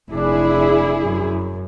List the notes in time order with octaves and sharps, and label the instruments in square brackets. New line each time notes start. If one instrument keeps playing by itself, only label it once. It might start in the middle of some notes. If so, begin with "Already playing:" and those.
[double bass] F1 D4 [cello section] E4 G#4
[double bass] F#2